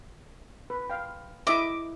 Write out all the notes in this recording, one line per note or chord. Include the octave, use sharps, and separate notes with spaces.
B4
F5 G5
E4 D#5 E5 D6